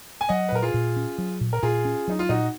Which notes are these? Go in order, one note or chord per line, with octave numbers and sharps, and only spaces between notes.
G#5
F#3 D#5 F#5
B4
A#2 A#4
F4 G#4
A#2
C#4
F#3
A#2
A#4
A#2 F4 G#4
C#4
F#3 D#4
F4
A#2 D#4 F#4